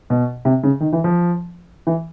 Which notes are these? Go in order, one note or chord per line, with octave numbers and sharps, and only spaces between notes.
B2
C3
C#3
D#3
E3
F3
E3